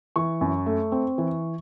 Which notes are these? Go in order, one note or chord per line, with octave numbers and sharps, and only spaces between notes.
E3 C#6
F#2
A3
C4
E3